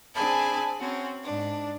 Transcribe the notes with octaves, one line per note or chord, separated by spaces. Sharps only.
C4 D4 G#4 G#5 A5 B5
C4 C#4 F#4
G#2 D4